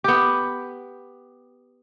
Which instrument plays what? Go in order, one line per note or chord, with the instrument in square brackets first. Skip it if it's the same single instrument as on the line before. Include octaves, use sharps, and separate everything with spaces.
[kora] B3 G4